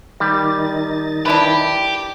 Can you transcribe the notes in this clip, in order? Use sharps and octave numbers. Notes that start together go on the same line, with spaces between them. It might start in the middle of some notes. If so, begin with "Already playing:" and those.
D#3 G3 D#4 A6
D4 E4 G4 B4